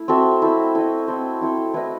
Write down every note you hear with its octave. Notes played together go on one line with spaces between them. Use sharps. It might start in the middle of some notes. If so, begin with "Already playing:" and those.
Already playing: A3 E4
C4 F#4 A4 E5
E4 A4 C5 D#5
E4 A4 C5 D#5
C4 E4 A4 C5
C4 E4 A4 C5
A3 E4 B4 D#5